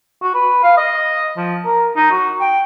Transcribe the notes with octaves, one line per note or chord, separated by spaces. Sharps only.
F#4
B4
F5
D#5
F3
A#4
D#4
F#4
G5